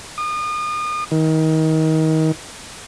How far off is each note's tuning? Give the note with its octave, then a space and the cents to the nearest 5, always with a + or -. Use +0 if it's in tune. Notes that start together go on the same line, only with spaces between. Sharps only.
D#6 -35
D#3 +30